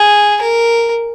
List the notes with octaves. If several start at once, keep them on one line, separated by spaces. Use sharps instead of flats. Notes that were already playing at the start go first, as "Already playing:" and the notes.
Already playing: G#4
A#4